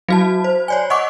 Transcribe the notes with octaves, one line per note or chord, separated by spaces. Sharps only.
F#3 F#4 A5
C5
C#5 D5 G#5
D#5 F#5 C#6 D6